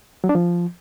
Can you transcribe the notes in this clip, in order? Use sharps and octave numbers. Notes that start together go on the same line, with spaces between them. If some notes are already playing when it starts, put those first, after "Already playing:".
F#3
D4
F3